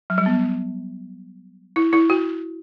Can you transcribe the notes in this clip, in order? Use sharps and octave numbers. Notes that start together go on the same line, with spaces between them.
F#3
G3
B3
E4
E4
F#4